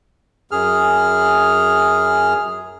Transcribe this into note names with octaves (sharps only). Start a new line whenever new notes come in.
F#2 G#4 F6